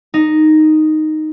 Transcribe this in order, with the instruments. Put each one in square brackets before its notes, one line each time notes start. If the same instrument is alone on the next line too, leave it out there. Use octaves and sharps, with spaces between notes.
[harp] D#4